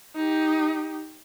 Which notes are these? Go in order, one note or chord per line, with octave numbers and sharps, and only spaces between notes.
D#4 G4